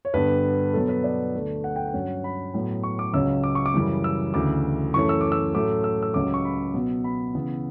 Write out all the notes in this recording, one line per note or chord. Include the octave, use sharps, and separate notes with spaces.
C#5
G2 D3 G3 B3 D4 B4
B2 F#3 B3 A4
B4
D5
D2 D3 A3
F#5
G5
F#5
G2 F#3 C#4
B5
A2 F#3 B3
C#6
D6
C#2 C#3 F#3 C#4 E6
D6
C#6
D6
F#2 C#3 E3 G3
E6
D2 C#3 E3 D6
F#2 E3 A3 C#4 C#6
E6
D6
E6
A2 F#3 A3 C#4 D6
E6
E6
C#2 C#3 F#3 C#4 D6
C#6
B5
B2 F#3 B3
B5
C#3 E3 B3